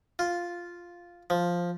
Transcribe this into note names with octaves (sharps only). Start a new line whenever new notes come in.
F4
F3